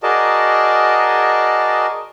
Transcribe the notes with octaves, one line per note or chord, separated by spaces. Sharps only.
F#4 G#4 A#4 D5 D#5 A5